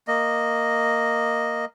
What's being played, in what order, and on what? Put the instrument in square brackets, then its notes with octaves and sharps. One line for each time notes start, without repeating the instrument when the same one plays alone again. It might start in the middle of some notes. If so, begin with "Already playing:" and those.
[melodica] A#3 D#5